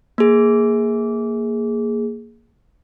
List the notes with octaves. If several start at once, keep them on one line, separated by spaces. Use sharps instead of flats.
A#3 G#4